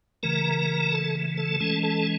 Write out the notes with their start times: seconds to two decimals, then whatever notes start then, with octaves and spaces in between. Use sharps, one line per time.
0.23 C#3 E3 A3 A#4 A#5
0.91 A4 A5
1.37 A4 A5
1.60 E3 G#3 C#4 A4 A5
1.83 A4 A5